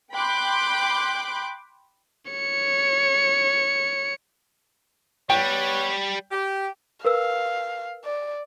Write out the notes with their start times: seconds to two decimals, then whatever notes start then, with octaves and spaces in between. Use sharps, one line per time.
0.12 G5 B5 C6 D6 F#6 G6
2.32 C#5 C#7
5.30 G3 B3 B4 C#5 G5
6.32 G4
7.05 A#4 B4 F5 E6
8.04 D5